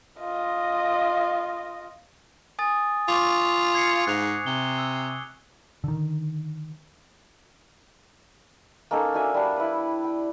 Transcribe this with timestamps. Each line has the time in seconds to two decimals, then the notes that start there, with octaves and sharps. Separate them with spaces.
0.20 F4 D#5
2.59 G#5 D#6 A6
3.08 F4 C#6 D6
3.75 G#6 C7 C#7
4.07 G#2 F#6 F7
4.46 C3 G7
4.79 E6
5.84 D3 D#3
8.91 A#3 C#4 D#4 A4
9.14 D4 F#4 E5 G#5
9.34 G3 D4
9.56 E4 B4
10.04 G5